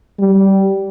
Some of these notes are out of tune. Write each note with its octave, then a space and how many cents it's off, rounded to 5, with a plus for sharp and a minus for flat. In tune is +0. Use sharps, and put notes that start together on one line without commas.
G3 -15